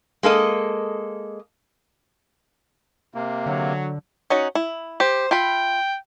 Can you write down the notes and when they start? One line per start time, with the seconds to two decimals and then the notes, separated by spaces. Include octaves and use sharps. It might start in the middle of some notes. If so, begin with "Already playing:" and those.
0.23 G#3 A#3 A4 D#5
3.14 C3 A#3
3.46 D3 F#3
4.30 C#4 D#4 F#4
4.55 E4
5.00 G4 C5
5.31 F4 E5 G5 B5